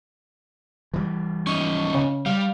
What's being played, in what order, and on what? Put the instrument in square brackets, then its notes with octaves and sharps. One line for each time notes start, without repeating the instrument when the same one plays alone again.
[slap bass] E3 G3
[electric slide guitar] C#4 D#4 [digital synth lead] C#6
[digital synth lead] C#3
[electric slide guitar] G3 [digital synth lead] F5